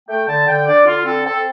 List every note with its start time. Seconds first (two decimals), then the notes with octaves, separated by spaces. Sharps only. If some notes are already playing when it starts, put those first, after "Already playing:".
0.08 A3 G5
0.27 D3 A5
0.47 D3 G5
0.67 D4 D5
0.86 D3 F4
1.05 C4 A4
1.25 C4 A4